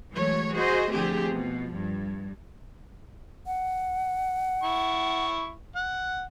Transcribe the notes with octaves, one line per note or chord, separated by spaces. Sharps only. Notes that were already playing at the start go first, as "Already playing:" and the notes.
E3 F#3 G#3 A3 C#5
F#4 G#4 C5 D#5
D3 F3 A3 C4 G4 G#4
B2 F3
G2
F#5
E4 C#6
F#5